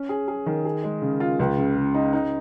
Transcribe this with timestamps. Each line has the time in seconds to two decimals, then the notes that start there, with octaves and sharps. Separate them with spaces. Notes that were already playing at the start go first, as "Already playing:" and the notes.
Already playing: C#4
0.09 G#4
0.28 G#4
0.46 D#3
0.65 G#4
0.84 G#3
1.02 C#3
1.20 F4
1.39 C#2
1.58 C#3
1.76 C#3
1.94 D#4
2.13 D#4